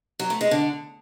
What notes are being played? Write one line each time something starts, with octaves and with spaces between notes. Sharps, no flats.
F#3
A3
G#3
D3